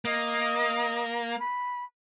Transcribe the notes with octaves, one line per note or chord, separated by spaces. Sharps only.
A#3 D#5 D#6
B5